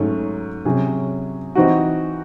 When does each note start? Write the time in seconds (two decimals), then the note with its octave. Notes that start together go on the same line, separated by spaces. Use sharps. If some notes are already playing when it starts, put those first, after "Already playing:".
Already playing: G#2 F#3 A3 C#4
0.65 C3 F#3 C#4 G#4
1.55 E3 C4 D#4 F#4